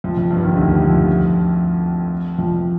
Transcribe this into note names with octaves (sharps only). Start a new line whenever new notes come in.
F2 F3
F2 F3
G2 G3
D#2 D#3
D2 D3
F2 F3
F2 F3